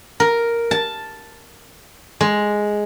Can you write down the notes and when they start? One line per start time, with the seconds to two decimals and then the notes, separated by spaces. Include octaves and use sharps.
0.20 A#4
0.71 A5
2.21 G#3